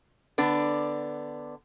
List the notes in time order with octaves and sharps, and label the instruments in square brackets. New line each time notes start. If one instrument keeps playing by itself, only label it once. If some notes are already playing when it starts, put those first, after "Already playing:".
[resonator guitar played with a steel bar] D3 B3 D4